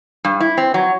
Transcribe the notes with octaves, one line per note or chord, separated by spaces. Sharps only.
G2
E4
C4
F#3